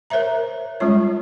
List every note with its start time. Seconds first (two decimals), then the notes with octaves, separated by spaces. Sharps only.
0.10 A#4 C5 C#5 E5 A#5
0.80 G3 G#3 C#4 F4 C#5